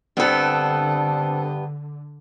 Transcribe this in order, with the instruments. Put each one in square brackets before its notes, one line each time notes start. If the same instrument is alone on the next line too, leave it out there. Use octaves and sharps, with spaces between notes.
[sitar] G2 B3 [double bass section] D3 [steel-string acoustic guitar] C4 A4